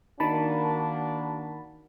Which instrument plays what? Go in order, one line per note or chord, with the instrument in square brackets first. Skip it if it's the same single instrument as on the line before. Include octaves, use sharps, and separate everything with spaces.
[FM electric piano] D#3 A5 B5 [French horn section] A#3 D4 F#4